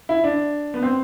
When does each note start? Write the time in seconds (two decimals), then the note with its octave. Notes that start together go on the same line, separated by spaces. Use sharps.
0.09 E4
0.24 D4
0.74 B3
0.83 C4